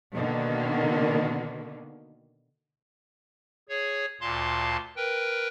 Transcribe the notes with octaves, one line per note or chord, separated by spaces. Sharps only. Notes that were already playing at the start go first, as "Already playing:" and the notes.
B2 D3 D#3 A#3
G#4 C#5
D2 A#2 F5 A5 C6
A#4 B4 G5